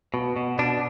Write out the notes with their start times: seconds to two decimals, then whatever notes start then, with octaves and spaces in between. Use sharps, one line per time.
0.14 B2
0.36 B2
0.59 B2 D4